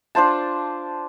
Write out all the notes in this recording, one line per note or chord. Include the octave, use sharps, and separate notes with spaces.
D4 F4 C5 A5